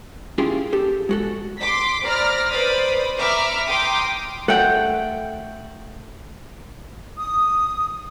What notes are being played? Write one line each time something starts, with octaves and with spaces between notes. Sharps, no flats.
C#4 E4 F4 G4 G#4 C6
G4 A4
G#3 F#4 A4
C6 D6 B6
C5 D5 A#5 B5 F6 A#6
B4 C5 D5 B5 D#6
E5 A#5 B5 C#6 D6 F6
G5 A#5 C6 D6 D#6
A3 F#5 G5
D#6